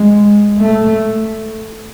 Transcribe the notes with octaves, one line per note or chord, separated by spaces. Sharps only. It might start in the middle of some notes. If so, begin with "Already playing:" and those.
Already playing: G#3
A3